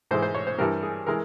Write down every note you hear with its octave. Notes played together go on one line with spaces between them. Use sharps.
G#2 E3 G#3 C5
C5
C#5
C5
G2 E3 G3 A#4
G#4
E3 G#3 A#4